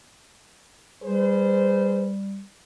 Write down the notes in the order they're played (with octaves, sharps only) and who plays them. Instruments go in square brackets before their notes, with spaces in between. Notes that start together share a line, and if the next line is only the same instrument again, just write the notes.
[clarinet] G3 [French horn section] G#4 B4 C5